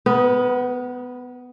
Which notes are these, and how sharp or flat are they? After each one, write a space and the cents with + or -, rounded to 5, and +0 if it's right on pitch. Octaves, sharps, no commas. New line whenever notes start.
B3 +15 B4 -40